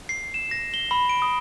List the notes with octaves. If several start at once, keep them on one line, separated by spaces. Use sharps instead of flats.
C7
E7
A#6
G7
B5
D7
D#6